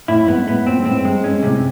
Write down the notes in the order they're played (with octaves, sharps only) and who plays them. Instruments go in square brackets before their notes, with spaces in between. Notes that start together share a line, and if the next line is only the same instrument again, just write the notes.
[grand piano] A2 [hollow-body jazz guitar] E4
[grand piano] G#2 [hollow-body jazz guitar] B3
[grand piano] A2 [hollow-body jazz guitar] B3
[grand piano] A#2 [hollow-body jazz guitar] C4
[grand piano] G#2
[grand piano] A2 [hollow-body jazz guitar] C4
[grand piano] G2 [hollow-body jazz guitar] G#3
[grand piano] G#2 [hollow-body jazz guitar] C#4
[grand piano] A2 [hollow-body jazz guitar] C3